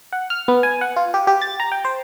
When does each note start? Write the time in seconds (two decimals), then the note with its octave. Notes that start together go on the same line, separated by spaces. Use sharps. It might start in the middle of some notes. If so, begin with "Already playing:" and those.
0.13 F#5
0.30 F6
0.48 B3
0.63 G#5
0.81 F#5
0.96 F4
1.14 G4
1.27 G4
1.42 A6
1.60 A#5
1.72 G5
1.85 C5